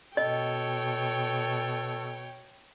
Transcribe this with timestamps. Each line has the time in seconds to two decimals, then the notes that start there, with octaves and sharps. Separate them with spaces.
0.17 B2 A4 C#5 D#5 G5